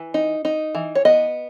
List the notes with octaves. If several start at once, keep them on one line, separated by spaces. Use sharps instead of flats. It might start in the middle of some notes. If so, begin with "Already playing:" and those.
Already playing: E3
D#4
D#4
E3
C#5
B3 D#5